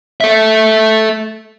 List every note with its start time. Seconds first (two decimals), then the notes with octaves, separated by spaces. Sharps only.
0.21 A4 E5